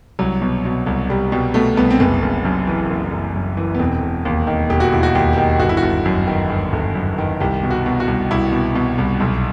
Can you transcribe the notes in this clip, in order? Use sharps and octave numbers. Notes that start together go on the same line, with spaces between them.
C2 F#3
B2
B2
C2
C2 G3
B2 G3
B2 A3
C2 B3
C4
F#1 B3
F#1
F#2
E3
F#1
F#1
F#2
E3
B3
E1 C4
E1
D#2
D#3
E1 G4
F#4
E1 E4
F#4
D#2 G4
D#3 G4
G1 F#4
E4
F#4
G1
F#2
D#3
G1
G1
F#2
D#3
C2 G4
B2
F#4
B2
F#4
C2
C2 E4
B2
B2
C2
B1